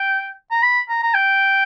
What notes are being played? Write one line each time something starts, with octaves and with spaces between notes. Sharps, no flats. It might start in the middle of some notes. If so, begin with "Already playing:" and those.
Already playing: G5
A#5
B5
A#5
A#5
G5